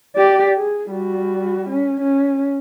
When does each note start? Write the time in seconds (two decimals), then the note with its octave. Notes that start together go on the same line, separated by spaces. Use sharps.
0.16 G4 D5
0.56 G#4
0.91 G3 F#4
1.70 C#4
2.01 C#4